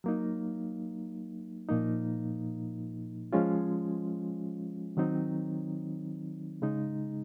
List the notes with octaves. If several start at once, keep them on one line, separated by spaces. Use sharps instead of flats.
F#3 A#3 D#4
A#2 F3 A#3 D#4
F3 G#3 C#4 F4
D#3 F#3 C4 D#4
C#3 G#3 D#4